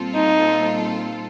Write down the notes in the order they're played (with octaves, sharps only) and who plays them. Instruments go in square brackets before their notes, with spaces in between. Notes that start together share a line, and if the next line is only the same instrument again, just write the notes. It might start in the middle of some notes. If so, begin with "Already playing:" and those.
Already playing: [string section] A#2 G3 C4 F4 A4
[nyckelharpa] D#4